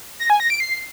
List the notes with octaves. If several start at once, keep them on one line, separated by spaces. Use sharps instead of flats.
A#6
G#5
A#6
D7
C7